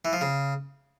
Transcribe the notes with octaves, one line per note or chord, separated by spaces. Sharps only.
E3
F3
C#3